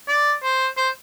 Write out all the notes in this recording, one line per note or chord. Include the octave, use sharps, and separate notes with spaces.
D5
C5
C5